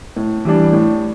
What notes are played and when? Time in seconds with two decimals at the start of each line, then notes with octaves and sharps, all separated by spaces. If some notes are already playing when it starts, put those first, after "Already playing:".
0.16 A2
0.45 E3 G3 D4
0.73 A2